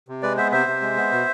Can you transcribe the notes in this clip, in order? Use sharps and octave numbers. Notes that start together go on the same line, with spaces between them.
C3
G#3 B4 D5
B3 C5 E5
C3 C5 E5
C3
G#3
B3
B2